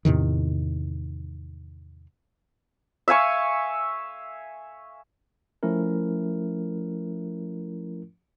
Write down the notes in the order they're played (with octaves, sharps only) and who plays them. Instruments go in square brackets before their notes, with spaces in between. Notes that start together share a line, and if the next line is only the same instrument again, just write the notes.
[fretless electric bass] E2 A2 C3 D#3
[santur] E5 F5 G#5 C#6
[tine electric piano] F3 A3 C#4 E4 A#4